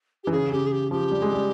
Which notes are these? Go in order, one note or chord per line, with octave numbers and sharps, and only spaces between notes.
E3 G4
C#3 G#4
C#3 G4
G#4
G4
F3 G4
G3
G#3
G3